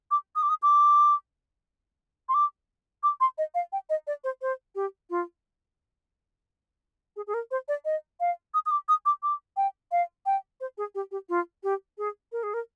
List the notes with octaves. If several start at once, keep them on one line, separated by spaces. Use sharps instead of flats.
D6
D#6
D6
D#6
D6
C6
D6
D6
C6
D#5
F5
G5
D#5
D5
C5
C5
G4
F4
G#4
G#4
A#4
C5
D5
D#5
F5
D#6
D#6
D6
D#6
D6
D6
G5
F5
G5
C5
G#4
G4
G4
F4
G4
G#4
A#4
G#4
A#4